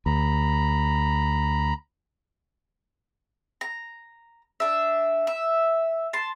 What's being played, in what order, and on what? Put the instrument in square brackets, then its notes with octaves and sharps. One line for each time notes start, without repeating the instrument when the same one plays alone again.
[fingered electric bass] D2 [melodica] A#5 B5
[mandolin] A#5
D4 E5
E5
A5 C6